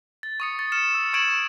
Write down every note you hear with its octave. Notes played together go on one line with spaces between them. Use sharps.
A6
C#6 D#6 C#7
A6
F6 C#7 E7
E6
C#6 G#6 D7 E7 F#7